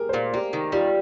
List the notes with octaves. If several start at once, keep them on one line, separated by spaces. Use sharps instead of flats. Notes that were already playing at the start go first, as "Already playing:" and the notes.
Already playing: G4 G#4 A#4
C5
A#2 D5
A#3 G4
D#3
G3 F4